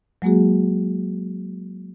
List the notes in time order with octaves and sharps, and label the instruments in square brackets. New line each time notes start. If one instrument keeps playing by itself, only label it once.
[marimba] F#3 G#3 A#3 F#4 G#4